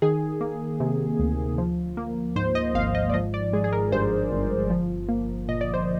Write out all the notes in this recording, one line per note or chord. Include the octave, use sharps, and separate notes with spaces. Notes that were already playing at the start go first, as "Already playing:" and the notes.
D#3 G#4
A#3
C3
D2
F3
A#3
G#2 C5
D#5
G#1 F5
D#5
D5
F3 D#5
D5
G#3 G#4
G#4
A#4
G2 C5
G1
F3
A#3
A#2 D#5
D5
C5